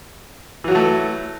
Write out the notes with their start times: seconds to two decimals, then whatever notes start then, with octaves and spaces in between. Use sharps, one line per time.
0.64 E3
0.68 F#3
0.71 F#4
0.75 A3